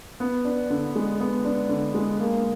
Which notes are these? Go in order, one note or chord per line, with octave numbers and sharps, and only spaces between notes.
B3
D4
D3
G#3
B3
D4
D3
G#3
A#3